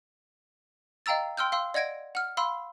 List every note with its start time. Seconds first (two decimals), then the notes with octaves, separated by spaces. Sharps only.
1.06 D#5 F5 G5 A#5 E6 A6
1.37 G5 C6 E6 F6 G6
1.52 F5 C6 E6
1.74 D5 D#5 F#5 G#6 A#6 D7
2.15 F#5 F6
2.37 F5 B5 C6 E6